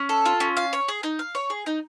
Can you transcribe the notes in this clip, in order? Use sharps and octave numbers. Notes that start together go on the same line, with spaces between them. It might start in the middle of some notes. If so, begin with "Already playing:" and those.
Already playing: C#4
A4
F4
C#4
F5
C#5
G#4
D#4
F5
C#5
G#4
D#4